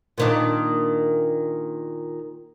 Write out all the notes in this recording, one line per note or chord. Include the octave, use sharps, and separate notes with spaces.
A#2 D#3 D4